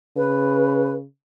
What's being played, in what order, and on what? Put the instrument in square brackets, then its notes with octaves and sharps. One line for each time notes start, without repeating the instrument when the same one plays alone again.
[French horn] C#3 [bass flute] B4